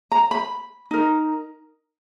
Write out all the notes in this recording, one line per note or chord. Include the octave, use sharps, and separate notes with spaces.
A#5
B5
D#4 A#4